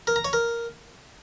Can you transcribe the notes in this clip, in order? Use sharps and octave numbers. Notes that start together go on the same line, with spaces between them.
A#4
A#5
C#5
A#4